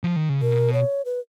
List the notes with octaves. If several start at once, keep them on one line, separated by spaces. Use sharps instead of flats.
F3
D#3
C#3
B2 A#4
C#5
B4